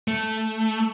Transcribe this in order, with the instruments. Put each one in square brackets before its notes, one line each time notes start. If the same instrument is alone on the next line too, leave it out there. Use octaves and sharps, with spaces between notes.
[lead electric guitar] A3